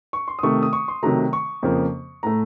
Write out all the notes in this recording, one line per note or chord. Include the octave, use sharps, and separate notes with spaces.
C#6
C6
D#6
C3 D#3 A3 C#6
D#6
C#6
C6
C3 D#3 F#3 A3 A#5
C#6
F2 C#3 F3 A#3
A2 A3 A#5